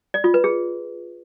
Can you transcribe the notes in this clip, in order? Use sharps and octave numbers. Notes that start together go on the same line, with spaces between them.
D5
F4
B4
G#4